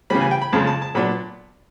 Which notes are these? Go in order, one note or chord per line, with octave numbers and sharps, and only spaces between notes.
C#3 E3 G3 B5
G#5
G5
B5
F2 C#3 F3 G#3 A5
A5
A5
A#2 F#3 B3 D4 B5